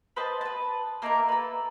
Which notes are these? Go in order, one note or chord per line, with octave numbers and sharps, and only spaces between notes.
B4 C5 D#5 A5
B4 A5
A#3 D#4 E4 A#4
A4 B4